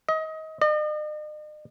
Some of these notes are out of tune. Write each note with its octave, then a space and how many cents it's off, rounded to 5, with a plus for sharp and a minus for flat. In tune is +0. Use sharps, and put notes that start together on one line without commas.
D#5 +25
D#5 -45